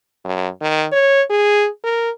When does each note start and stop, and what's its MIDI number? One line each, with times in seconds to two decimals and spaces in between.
0.25 0.48 42
0.61 0.86 51
0.92 1.22 73
1.30 1.68 68
1.84 2.10 70